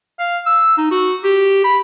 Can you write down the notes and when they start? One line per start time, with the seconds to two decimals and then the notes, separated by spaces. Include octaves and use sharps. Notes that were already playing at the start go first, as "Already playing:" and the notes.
0.19 F5
0.46 E6
0.78 D#4
0.91 F#4
1.24 G4
1.64 B5